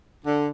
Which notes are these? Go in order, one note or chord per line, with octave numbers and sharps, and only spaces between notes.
D3